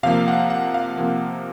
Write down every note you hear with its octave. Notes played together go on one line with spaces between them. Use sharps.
C3 F3 A#3 F5
F#5
F#5
F5
C3 F3 A#3